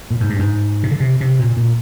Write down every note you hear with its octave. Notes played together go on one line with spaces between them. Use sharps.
A#2
G#2
G2
G#2
C3
D3
C3
C3
A#2
A#2